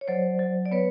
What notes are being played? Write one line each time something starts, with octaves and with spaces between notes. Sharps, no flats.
C#5
F#3 C5 D5
F#3
D5
B3 B4 C#5